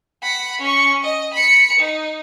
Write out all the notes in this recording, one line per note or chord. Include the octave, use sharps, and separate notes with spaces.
F#5 B5
C#4 C#6
D#5
B5 C#7
D#4